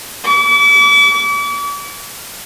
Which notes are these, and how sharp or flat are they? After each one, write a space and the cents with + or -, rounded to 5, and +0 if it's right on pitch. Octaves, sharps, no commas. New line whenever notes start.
D6 -40